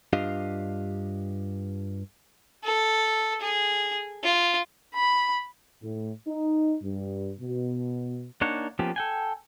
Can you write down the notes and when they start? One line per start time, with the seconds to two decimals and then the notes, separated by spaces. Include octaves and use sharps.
0.13 G2 D4 F4 G4 D#5 F5
2.64 A4
3.41 G#4
4.23 F4
4.94 B5
5.82 A2
6.27 D#4
6.82 G2
7.41 B2
8.41 A#3 D4 D#4 C#5 F#5
8.79 F3 A#3 B3 C#4 G4
8.96 A4 G5 G#5